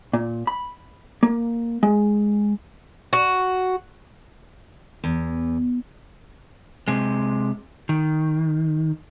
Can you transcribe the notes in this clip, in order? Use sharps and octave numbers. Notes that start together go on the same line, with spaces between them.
A#2
B5
A#3
G#3
F#4
E2
C3 G#3
D#3